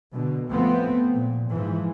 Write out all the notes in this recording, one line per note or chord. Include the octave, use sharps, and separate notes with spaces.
B2 D3
F3 A3 B3 C4
A#2
G#2 E3 F3